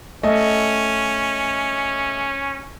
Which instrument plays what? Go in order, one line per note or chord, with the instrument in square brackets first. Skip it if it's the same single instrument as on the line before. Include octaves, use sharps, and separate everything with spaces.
[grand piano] A3 D#5 [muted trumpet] C#4